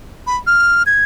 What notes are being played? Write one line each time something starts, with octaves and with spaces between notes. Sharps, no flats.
B5
F6
G#6